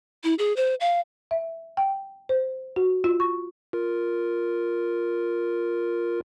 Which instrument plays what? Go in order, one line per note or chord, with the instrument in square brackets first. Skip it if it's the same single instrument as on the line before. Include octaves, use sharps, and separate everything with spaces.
[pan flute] E4
G#4
C5
F5
[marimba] E5
G5
C5
F#4
F4
C#6
[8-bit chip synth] F4 A#4